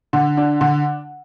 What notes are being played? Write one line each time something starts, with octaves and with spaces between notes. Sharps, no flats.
D3
D4
D3